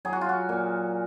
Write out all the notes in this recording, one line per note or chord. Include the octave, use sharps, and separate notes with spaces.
F#3 G#4
F#4
F4
F#4
A#2